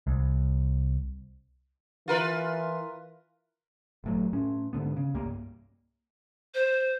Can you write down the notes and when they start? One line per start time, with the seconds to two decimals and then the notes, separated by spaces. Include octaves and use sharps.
0.07 C2
2.08 E3 F4 A#4 B4
4.04 G1 A2 F#3
4.33 A2 C#4
4.73 G#2 D3 B3
4.97 C#3
5.14 C2 G2 A#3
6.55 C5